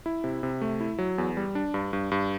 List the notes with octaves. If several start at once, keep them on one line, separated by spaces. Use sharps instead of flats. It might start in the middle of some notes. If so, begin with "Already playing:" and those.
E4
C3
C3
A3
E4
F#3
E2
G3
D4
G2
G2
G2